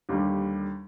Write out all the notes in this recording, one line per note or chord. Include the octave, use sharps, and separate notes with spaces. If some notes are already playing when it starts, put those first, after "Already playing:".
D#2 D3 G3